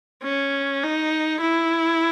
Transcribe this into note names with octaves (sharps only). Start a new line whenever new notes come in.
C#4
D#4
E4